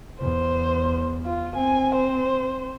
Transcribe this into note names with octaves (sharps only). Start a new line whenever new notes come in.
E2 C5
F4
C4 G#5
C5